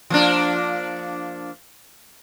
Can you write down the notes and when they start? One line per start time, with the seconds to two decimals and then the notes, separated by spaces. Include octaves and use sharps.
0.10 F3 A#3 D4